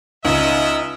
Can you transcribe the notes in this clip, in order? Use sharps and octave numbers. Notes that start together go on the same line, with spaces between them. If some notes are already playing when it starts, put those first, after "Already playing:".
C#2 D#4 D#5 E5 E6